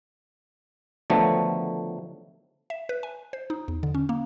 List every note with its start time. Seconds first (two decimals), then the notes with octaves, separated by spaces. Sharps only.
1.10 D3 D#3 F3 F#3 A3 B3
2.70 E5
2.89 B4
3.03 G#5
3.33 C5
3.50 D#4
3.68 E2
3.83 D3
3.94 C#4
4.09 A#3